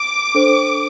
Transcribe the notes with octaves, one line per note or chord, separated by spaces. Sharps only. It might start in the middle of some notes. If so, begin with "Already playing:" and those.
Already playing: D6
D4 A4 C5